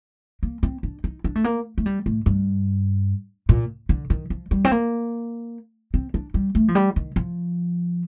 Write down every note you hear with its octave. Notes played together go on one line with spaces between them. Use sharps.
A#3
C4
D4
D#4
D4
A3
A#3
A3
G3
A2
G2
A#2
D3
D#3
F3
G3
C4
A#3
C4
D4
G3
A3
F3
G3
D#3
F3